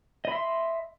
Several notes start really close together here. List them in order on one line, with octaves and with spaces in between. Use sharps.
D#5 B5 E5 C6